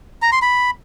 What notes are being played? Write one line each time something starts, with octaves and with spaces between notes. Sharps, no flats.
A#5
C6
B5